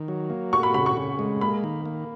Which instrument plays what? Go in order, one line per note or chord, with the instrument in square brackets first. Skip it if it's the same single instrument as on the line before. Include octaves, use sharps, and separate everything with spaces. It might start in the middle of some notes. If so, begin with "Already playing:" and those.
Already playing: [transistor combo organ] D#3
F#3
A#3
[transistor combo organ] F#4 [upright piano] C#6
[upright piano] B5
[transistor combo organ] C#3 [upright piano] B5
[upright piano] C#6
[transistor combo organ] C#3
G#3
[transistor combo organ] A#3 [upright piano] B5
[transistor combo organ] D#3
A#3